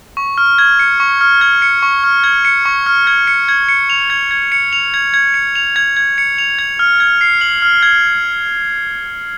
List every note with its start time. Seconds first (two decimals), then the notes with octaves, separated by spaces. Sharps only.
0.17 C#6
0.38 F6
0.58 G#6
0.79 C#7
1.00 C#6
1.21 F6
1.41 G#6
1.62 C#7
1.83 C#6
2.04 F6
2.24 G#6
2.45 C#7
2.66 C#6
2.86 F6
3.07 G#6
3.27 C#7
3.49 G#6
3.69 C#7
3.90 F7
4.10 G#6
4.31 G#6
4.52 C#7
4.73 F7
4.94 G#6
5.14 G#6
5.34 C#7
5.56 F7
5.76 G#6
5.97 G#6
6.18 C#7
6.38 F7
6.59 G#6
6.79 F6
7.00 G#6
7.21 C7
7.41 F#7
7.62 F6
7.83 G#6